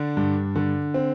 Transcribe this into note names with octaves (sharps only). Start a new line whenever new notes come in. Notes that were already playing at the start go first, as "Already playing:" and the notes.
Already playing: D3 D4
G2
D3
C4